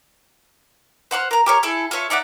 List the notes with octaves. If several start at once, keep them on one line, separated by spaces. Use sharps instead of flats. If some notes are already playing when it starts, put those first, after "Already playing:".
C5 F#5 C6 F6
A#4 A#5
G4 A#4 C#5
E4 G#4 A4
F4 A4 C#5 E5
D#4 D5 E5 F#5